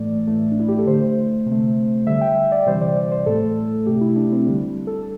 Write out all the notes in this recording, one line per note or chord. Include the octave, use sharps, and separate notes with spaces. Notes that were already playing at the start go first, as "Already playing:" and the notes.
Already playing: A2 E3 A3 D5
A2 E3 A3
D4
E4
G4
A4
D3 A3 C5
C3
A3
D3 G3 E5
G5
E5
D5
C3 E3 G3 C5
D5
D5
C5
A2 A3 A4
C3 A3 G4
E4
D4
C4
D3 G3 D4
A4